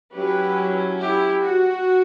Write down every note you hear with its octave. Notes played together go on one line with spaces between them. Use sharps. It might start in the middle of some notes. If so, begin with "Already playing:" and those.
F#3 C#4 E4 G4 B4
E4 G4
F#4